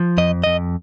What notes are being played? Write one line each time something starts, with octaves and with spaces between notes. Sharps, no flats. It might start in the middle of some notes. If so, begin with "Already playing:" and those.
Already playing: F3
F2 D#5
F2 D#5